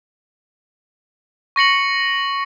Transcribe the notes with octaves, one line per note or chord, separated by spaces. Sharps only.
C#6 A#6 C#7 F#7